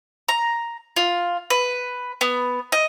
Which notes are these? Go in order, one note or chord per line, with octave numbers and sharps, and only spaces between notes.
A#5
F4
B4
B3
D#5